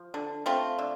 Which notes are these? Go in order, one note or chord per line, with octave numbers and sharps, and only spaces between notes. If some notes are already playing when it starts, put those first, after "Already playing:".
Already playing: F3
D3
A3 C4 F4
D3